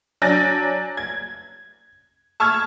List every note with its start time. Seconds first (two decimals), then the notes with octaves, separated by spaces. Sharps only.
0.22 F#3 D4 G#5 G6 A6 A#6
0.97 G#6
2.40 A5 C#6 E6 F6 G#6